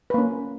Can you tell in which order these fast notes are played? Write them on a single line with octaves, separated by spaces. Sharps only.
B4 A#3 C#4